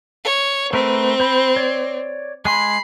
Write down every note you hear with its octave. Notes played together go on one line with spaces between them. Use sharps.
C#5
A3 C4 A#4 B4
C5 B5
C#5 D5
G#3 G#5 B5 C6 C7